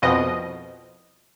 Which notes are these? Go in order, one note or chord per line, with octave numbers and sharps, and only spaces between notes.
C2 F2 B2 F3 D#5